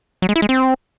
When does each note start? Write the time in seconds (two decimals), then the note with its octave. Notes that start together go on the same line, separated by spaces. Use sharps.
0.22 F#3
0.29 G#3
0.36 E4
0.42 G#3
0.49 C4